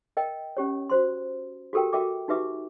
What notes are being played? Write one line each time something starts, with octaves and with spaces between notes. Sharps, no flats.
A#4 D#5 G5
C#4 G4 C#5
F#4 C5 C6
F#4 G4 A4 A#4 G5
F#4 A#4 E5 G5 D6
D#4 F#4 G4 B4 E5 D6